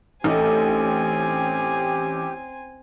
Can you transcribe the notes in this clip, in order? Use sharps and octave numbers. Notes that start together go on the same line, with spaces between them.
A1 A3 C4 D#4 G4 G#5